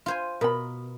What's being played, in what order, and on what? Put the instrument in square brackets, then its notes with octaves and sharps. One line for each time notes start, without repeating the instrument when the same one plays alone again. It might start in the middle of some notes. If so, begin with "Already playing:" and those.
[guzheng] F4 C5 G#5
[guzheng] B2 [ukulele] A#4 B5